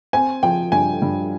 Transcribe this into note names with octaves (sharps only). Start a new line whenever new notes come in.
C4 G#5
F3 G5
G2 G#5
G2